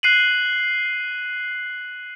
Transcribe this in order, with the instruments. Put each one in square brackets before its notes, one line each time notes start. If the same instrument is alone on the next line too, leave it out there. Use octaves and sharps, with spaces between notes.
[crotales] F#6 C7 D#7 F#7